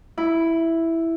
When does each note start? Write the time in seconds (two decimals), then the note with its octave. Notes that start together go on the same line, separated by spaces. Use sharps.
0.18 E4